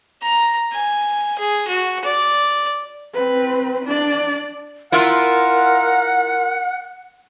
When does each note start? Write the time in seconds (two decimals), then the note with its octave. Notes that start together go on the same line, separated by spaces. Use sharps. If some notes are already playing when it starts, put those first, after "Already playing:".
0.22 A#5
0.73 G#5
1.39 G#4
1.68 F#4
2.05 D5
3.14 C4 B4
3.85 D4 D5
4.92 E4 F4 A#4 F#5